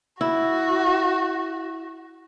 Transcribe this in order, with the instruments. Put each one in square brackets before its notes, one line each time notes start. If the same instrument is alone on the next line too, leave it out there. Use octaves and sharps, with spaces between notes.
[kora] E4 [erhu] F#4